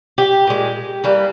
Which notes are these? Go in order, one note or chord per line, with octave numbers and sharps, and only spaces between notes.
G4
A#2 G#3
E3 G3 A#3